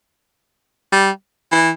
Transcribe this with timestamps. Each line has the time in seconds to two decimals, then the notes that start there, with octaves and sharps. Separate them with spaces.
0.92 G3
1.52 E3